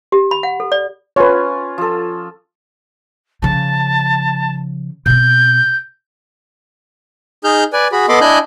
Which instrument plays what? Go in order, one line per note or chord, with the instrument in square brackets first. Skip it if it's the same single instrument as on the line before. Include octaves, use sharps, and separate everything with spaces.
[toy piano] G4
B5
F#5
A4
D5
[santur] C#4 F4 [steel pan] B4 C#5
[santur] F3 A4
[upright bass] C#3 F3 [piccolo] A5
[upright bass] B2 C4 [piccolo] G6
[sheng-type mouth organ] D#4 G#4 F6 G6
B4 D5 G#5
F#4 G#4 B5
B3 A4 D#5 B5 C6 D6
D4 E4 D#5 G#5 F#6 G6